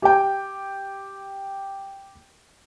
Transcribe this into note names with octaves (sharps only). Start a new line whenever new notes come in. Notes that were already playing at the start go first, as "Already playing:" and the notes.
G4 G5